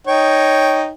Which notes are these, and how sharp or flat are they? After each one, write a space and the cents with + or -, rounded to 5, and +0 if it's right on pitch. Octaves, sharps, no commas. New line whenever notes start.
D#4 +0 C#5 +0 G5 +0